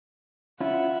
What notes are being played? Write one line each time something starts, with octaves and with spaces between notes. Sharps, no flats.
C#4 E4 F4 E5 F#5